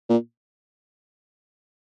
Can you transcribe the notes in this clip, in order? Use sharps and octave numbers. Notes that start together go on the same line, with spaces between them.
A#2